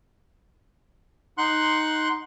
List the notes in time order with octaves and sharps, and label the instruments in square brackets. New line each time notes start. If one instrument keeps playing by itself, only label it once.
[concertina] D#4 F#5 C6 F#6